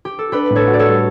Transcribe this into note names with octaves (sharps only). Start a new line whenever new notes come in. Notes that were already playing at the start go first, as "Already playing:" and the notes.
G4
A4
D4 G4 B4
A2
A4 C#5
F#4
D5
A4 C#5
G3